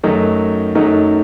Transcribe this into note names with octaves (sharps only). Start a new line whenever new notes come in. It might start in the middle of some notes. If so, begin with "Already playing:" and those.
F#2 D#3 F#3 A3 D#4
F#2 D#3 F#3 A3 D#4